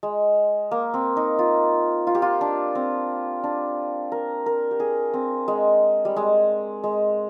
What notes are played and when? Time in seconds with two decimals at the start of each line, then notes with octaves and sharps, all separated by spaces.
0.03 G#3
0.71 A#3
0.94 C4
1.17 D#4
1.39 F4
2.07 F4
2.15 G4
2.22 F4
2.41 D4
2.75 C4
3.44 D4
4.12 A#4
4.46 A#4
4.71 G4
4.80 G#4
5.14 C4
5.48 G#3
6.05 G3
6.16 G#3
6.84 G#3